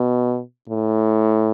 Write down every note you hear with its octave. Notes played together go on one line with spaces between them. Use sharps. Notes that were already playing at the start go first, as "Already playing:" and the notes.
Already playing: B2
A2